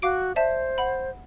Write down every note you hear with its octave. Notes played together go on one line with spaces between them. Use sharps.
F#4 F5 D6 D7
C5 D5 E5 A5
F#5 B5